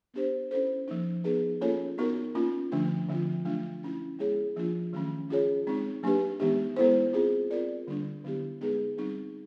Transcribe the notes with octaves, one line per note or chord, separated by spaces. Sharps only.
B3 D4 G4 C5
C#4 E4 A4 C5
F3 A#3 D#4
B3 D#4 G#4 B4
A#3 C#4 F4 A4 C#5
B3 D#4 F#4 A#4
A#3 C#4 F4
D3 F3 A3 D4
D3 F3 A3 C4 F4
F#3 A3 D4 F4
A3 C#4 E4
G#3 B3 E4 G#4 C#5
F3 A#3 D4 F4
D#3 F#3 A3 C#4
C#4 F4 G#4 C#5
G#3 C4 D#4
F#3 A#3 D4 G4 B4
E3 G#3 B3 D#4 G4
G#3 B3 E4 A4 C5
C4 F4 G#4
C4 F4 A#4 D5
D3 G3 A#3 D4
D3 F#3 B3 E4 G4
G#3 B3 D#4 G#4 B4
G3 C4 D#4